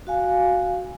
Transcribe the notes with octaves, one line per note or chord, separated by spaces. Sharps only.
F#4 F5 G#5